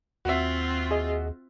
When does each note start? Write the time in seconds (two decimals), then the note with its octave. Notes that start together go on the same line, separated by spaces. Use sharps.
0.25 D#2 C4 F4 F#4 E5
0.91 G#4 D#5